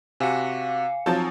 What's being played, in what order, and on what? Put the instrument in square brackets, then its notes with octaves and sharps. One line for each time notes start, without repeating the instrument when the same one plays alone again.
[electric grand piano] C3 F#4 [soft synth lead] F5 [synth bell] G#5 D6 C#7
[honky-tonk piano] F3 F#3 [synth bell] C4 F4 [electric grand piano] A5 G6 A6